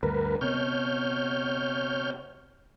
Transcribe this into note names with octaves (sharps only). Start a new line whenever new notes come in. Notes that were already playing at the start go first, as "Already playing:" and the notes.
D2 G2 A#4 B4
C3 B3 C#5 F6 G6